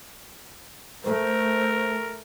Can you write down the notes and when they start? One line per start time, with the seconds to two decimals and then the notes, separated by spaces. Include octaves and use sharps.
1.04 A3 A#4 C5